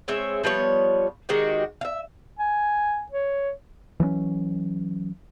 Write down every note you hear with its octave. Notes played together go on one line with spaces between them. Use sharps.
G#3 C4 C#5 E5
F3 G3 B3 C#5
D#3 G#3 F#4 G4
E5 F5
G#5
C#5
E3 F#3 G#3 C#4